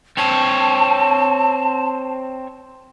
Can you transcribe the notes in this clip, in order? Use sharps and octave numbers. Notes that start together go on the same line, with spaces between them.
C4 C#5 A5